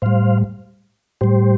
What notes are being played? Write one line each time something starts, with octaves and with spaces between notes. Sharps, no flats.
A2 G3 C5 F5
A2 G3 G4 C5